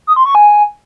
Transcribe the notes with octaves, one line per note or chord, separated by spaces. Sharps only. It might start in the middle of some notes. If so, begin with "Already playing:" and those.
D#6
C6
C#6
G#5